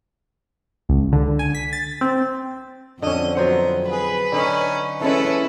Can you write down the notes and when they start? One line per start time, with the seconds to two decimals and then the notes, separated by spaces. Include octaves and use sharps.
0.89 C#2
1.12 D3
1.39 G#5
1.55 B6
1.73 A6
2.01 C4
3.02 F2 D3 C#4 D#5
3.35 F#3 B3 C5 F#5
3.89 G#4 B4
4.32 D3 C#4 D#4
5.01 E3 G#3 C#4 E4 A4 B4